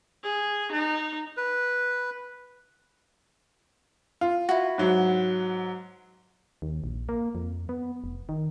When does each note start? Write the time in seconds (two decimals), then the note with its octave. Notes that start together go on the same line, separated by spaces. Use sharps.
0.23 G#4
0.72 D#4
1.37 B4
4.21 F4
4.49 E4 F#4
4.78 G#2 F#3
6.62 D#2
6.84 A#1
7.09 A#3
7.35 F2
7.69 B3
8.04 F1
8.29 D#3